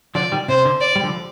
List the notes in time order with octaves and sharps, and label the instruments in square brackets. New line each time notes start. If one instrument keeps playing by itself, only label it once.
[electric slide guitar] D3 F3 [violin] D5
[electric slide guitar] D#3 G3
[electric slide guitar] C3 [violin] C5
[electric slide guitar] D3
[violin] D5
[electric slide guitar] G3
D3 F3